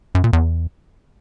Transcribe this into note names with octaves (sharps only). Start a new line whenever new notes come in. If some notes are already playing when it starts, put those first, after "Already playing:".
F#2
A#2
E2